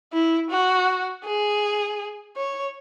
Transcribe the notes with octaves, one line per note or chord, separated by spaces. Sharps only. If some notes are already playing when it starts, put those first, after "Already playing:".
E4
F#4
G#4
C#5